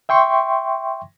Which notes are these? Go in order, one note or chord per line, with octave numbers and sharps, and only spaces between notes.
E5 G5 C6 C#6